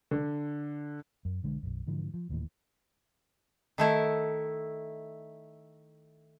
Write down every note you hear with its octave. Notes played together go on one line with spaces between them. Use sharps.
D3
F#2
B1 D3 G#3
B1 F#2
G#2 D3 E3 F3
F3
D#1 D#2 A2 E3
D#3 A3 E4